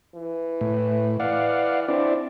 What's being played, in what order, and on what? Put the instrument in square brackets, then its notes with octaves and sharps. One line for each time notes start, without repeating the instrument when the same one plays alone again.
[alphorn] E3
[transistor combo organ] A2
[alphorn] E3 [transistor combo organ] D5 F5 F#5
[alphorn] C4 [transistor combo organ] D4 E4 D5